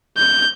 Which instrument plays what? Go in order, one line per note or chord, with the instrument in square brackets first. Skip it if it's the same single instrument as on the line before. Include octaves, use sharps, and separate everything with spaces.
[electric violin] G6